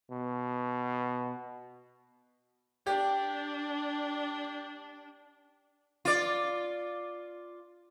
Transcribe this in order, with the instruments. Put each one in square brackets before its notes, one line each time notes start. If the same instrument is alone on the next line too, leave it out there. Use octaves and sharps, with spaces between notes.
[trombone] B2
[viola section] D4 [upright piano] G4
[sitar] F4 D5